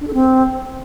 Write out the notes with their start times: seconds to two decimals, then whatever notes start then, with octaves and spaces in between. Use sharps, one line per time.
0.01 D4
0.07 A4
0.14 C4